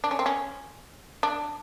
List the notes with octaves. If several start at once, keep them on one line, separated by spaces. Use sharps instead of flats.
D4
C#4
C4
C#4
D4